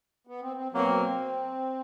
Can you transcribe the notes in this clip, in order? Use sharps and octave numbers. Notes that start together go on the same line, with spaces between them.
B3
C4
C4
B2 F#3 A#3 C4